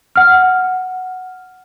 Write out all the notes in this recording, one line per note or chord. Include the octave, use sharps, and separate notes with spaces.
F#5 F6